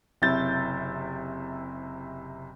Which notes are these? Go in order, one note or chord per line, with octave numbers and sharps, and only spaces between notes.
F#1 C3 E4 G6 A6